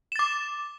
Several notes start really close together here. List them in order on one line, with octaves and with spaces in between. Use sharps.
E7 A6 D6